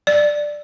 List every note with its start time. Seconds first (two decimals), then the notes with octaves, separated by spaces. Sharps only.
0.07 D5